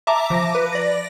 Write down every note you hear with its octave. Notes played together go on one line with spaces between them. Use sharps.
E5 A5 A#5 D6
F3 D6 A#6
B4
D5 A#6